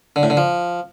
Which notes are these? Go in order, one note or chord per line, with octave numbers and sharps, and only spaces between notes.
D3
A2
D3
F3